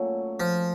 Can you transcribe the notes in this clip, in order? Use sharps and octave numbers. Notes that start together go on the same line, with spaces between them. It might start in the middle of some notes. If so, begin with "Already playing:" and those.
Already playing: A#2 F#3 A3 C#4
F3